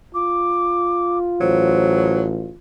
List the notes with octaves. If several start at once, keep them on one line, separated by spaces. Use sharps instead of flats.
F4 D6
A1 F#3 C5